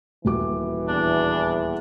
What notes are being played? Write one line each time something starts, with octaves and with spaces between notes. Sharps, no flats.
D#1 E3 F#4 D6
E2 D4